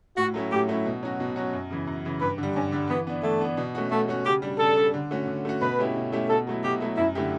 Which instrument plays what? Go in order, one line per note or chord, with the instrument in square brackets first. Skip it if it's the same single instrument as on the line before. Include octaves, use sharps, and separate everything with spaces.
[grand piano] A2 [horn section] F#4
[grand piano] F#3 A3 C#4 E4
[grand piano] A2 [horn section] G4
[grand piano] F#3 A3 C#4 E4
B2
F#3 C#4 F#4
B2
F#3 C#4 F#4
F#2
C#3 E3
F#2
C#3 E3
[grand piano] G2 [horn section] B4
[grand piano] D3 G3
[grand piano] G2 [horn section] C#4
[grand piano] D3 G3
[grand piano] E3 [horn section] B3
[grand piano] B3 D4
[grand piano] E3 [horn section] A3
[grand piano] B3 D4
B2
A3 C#4 F#4
[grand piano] B2 [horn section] A3
[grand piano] A3 C#4 F#4
[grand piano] C#3 [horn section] G4
[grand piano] G3 D4
[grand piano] C#3 [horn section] A4
[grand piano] G3 D4
D3
A3 C#4 F#4
D3
A3 C#4 F#4
[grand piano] B2 [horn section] B4
[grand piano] A3 C#4 E4 G4
B2
A3 C#4 E4 G4
[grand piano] B2 [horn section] A4
[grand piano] F#3 A3 E4
[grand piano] B2 [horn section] G4
[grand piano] F#3 A3 E4
[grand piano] F#2 [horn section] E4
[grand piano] D3 A3 E4 G4